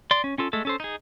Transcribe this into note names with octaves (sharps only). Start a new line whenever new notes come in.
D5 C6
C#4
C#4 F4 A4
G#3 A3 A4
C#4 A4 C5
D#4 G#4